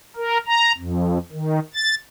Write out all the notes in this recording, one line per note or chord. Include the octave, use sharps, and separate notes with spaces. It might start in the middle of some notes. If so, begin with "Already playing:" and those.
A#4
A#5
F2
D#3
A6